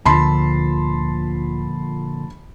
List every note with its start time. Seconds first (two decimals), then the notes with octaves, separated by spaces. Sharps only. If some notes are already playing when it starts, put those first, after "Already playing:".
0.05 D2 A#2 D3 F3 A5 B5 C6